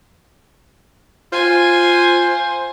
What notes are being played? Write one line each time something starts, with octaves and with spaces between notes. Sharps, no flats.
F4 C5 G#5